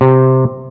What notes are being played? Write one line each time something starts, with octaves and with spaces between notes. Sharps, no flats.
C3